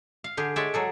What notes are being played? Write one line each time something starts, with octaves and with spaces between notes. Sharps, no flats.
F5
D3 G4 G#4
G#3 C#5 D5 E5
F#3 G#4 A4